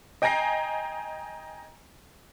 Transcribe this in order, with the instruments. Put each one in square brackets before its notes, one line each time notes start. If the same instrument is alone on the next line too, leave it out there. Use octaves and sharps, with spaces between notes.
[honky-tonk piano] D#5 G5 G#5 A#5 A#6 C7